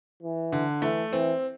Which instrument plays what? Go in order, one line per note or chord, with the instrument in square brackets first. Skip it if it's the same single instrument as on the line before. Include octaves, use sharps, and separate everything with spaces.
[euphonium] E3
[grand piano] D3
[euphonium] E3 [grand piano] A3
[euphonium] E3 [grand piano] C4